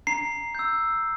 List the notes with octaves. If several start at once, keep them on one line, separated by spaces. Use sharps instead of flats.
A#5 C7
E6 G6